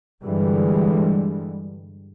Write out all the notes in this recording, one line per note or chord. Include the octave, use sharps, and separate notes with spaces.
G2 D3 E3 G3 G#3